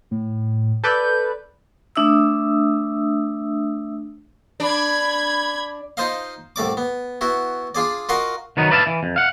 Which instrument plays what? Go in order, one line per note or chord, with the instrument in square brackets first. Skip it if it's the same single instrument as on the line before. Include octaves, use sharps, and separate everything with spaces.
[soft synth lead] A2
[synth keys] A4 B4 D5 [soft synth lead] G6
[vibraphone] A3 D4 E5 D#6 E6
[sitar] D4 [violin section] B5 G#6
[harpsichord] D#4 F4 C5 D#5 F5
C2 A2 D5 D6
B3
B3 E4 F#4
D4 F4 G#4 D5
F4 F#4 A#4 D#5 F5 F#5
[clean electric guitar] D#3 F#3 B3 D#4
B4 D5 E5 F5 G#5 A5
E3
F2
F5 F#5